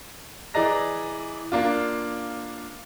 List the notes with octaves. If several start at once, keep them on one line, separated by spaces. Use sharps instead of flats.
E3 G#4 D5 D#5 A#5 A#6
A#3 D4 F4